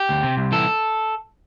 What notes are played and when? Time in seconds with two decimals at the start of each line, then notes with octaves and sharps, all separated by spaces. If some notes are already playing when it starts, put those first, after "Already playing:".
Already playing: G4
0.09 D2
0.23 C3
0.37 C2
0.52 E3 A4